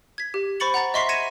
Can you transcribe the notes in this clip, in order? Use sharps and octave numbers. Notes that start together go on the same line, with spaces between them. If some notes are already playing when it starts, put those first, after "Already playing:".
G#6 B6
G4
C5 B5 C#6 A6 C#7 F#7
F#5 A#5 A6
D#5 E5 C6 C#6 B6 C7
G#6 A#6 C#7 D#7 E7